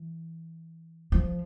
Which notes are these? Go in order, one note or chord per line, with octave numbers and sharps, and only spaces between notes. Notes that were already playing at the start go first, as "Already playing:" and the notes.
Already playing: E3
F3